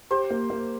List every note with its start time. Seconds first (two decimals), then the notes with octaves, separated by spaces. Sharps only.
0.11 G4 C5
0.30 A#3
0.50 A#3